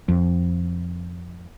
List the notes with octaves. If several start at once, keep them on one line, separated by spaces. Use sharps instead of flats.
F2